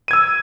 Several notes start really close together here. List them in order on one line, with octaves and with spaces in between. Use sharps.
D#7 G#6 E6